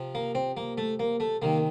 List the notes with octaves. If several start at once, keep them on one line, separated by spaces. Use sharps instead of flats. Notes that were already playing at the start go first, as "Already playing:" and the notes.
Already playing: C3 F3
A#3
C4
A#3
A3
A#3
A3
C3 D#3 A#3